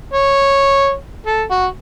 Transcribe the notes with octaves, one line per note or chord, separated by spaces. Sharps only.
C#5
A4
F#4